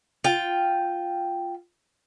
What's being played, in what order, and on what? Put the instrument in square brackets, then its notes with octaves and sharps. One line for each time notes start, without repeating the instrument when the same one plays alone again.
[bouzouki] F4 G5